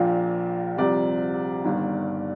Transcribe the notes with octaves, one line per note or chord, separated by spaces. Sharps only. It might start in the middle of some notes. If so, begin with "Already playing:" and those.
Already playing: A#1 A#2 F3 F5
C2 C3 F3 D5
G1 G2 D#3